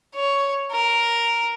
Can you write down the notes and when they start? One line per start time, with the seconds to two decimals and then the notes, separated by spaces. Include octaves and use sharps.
0.15 C#5
0.72 A#4